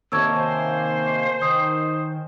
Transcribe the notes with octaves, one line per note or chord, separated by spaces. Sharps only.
C3 D#3 A#3 A#4 C#5 A5 E6 G#6
C5 G#5
D#3 D#6